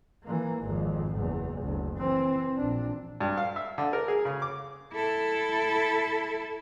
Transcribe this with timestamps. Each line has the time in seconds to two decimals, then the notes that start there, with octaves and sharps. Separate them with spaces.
0.23 E3 A#3
0.63 G#1 F2
1.16 F#1 E2
1.61 F#1 D2
1.98 E3 C4
2.57 A#1 D4
3.21 G2
3.37 F5
3.56 E5
3.78 D3
3.93 A#4
4.08 G#4
4.25 C#3
4.42 D6
4.94 E4 A4